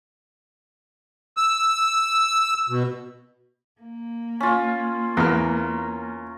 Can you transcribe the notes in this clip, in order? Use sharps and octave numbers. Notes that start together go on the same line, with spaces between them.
E6
B2
A#3
C#4 F4
E2 A#4 F6